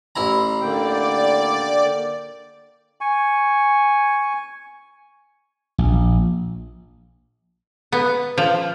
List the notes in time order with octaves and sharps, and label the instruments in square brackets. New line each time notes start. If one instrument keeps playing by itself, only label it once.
[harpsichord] A1 E4 A#5
[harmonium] D3 A#3 G5 [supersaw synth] D5
[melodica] G#5 C#6
[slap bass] A#1
[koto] B3
F3